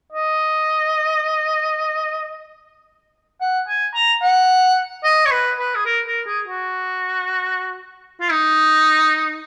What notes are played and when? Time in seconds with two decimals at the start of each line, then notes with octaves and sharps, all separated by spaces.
0.13 D#5
3.41 F#5
3.68 G#5
3.95 A#5
4.23 F#5
5.04 D#5
5.26 C#5
5.31 B4
5.59 B4
5.75 G#4
5.86 A#4
6.07 A#4
6.27 G#4
6.47 F#4
8.21 F4
8.32 D#4